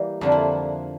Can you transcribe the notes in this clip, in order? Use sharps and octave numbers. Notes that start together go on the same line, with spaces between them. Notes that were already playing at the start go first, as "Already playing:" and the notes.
Already playing: E3 G3 A#3 G4
F2 D3 F3 A#3 A4
E4